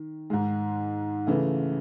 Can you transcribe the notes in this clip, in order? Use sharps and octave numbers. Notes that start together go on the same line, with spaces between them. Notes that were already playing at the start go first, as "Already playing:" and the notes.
Already playing: D#3
G#2 D#3 G#3
C#3 E3 A3